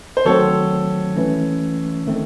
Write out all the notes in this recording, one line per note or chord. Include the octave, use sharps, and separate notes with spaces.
C5
D#3 F#3 A3 C4 A4 C#5
E3 A3 C#4
D#3 A3 C4